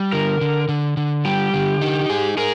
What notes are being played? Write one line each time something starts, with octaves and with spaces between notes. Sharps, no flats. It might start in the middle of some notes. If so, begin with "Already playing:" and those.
Already playing: G3
D3 A#4
D3
D3
D3
G3 G4
D3
D#4
G#4
G#4 A#4